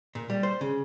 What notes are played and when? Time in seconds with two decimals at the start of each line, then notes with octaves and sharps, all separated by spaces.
0.15 A#2
0.30 G3
0.43 C5
0.61 C#3